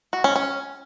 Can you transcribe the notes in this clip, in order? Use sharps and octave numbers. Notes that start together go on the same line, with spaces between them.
F#4
C#4
C#4